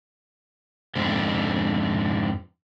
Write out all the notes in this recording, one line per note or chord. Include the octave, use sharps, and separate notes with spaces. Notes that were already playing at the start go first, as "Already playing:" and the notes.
F2 G#2 D3